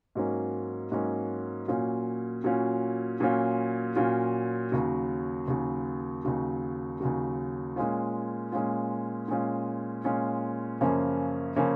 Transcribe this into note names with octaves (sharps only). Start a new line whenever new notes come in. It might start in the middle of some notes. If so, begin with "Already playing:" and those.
G#2 F#3 A#3 C#4
G#2 F#3 A#3 C#4
A#2 F#3 C#4 F4
A#2 F#3 C#4 F4
A#2 F#3 C#4 F4
A#2 F#3 C#4 F4
D#2 C#3 F#3
D#2 C#3 F#3
D#2 C#3 F#3
D#2 C#3 F#3
A#2 G#3 C#4 F4
A#2 G#3 C#4 F4
A#2 G#3 C#4 F4
A#2 G#3 C#4 F4
F#2 C#3 F3 A#3 C#4
C#3 F3 A#3 C#4